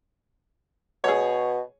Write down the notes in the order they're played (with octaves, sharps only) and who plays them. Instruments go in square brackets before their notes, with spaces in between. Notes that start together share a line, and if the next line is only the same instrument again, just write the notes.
[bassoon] B2 [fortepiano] G#4 C#5